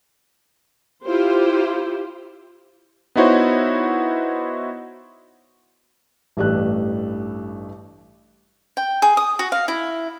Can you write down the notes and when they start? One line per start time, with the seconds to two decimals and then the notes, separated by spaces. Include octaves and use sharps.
1.04 E4 F4 G4 C5
3.16 B3 D#4 E4 F#4 C5 C#5
6.37 A1 G2 A3 D4 G4 F#6
8.77 G5
9.02 G#4
9.17 D#6
9.39 F#4
9.52 F5
9.68 E4